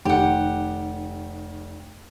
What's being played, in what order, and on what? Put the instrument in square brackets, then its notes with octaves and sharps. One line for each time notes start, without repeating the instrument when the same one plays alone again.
[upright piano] F1 D#3 [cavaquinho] G4 F#5